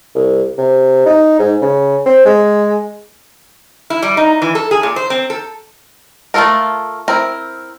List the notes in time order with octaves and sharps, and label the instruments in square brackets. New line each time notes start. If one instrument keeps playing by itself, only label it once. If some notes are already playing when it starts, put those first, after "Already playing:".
[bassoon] C2
C3
D#4
G#2
C#3
C4
G#3
[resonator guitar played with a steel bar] E4
G3
D#4
E3
A4
G#4
A#2
C5
C4
A4
[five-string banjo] A3 A#3 F4 A4 A#4
C4 E4 A#4